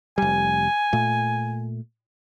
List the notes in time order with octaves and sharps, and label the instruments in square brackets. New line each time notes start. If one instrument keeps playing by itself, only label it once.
[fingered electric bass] F1 G3 [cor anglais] G#5
[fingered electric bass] A#2 A3